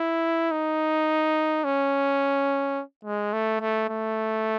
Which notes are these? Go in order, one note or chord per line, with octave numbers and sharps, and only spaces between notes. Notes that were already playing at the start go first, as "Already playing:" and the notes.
Already playing: E4
D#4
C#4
G#3
A3
A3
A3